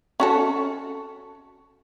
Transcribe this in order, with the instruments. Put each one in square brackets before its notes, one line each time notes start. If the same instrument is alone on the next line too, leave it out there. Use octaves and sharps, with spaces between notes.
[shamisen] C#4 F#4 A4